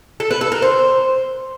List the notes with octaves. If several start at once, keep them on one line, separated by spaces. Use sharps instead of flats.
A4
B4
A4
A#4
C5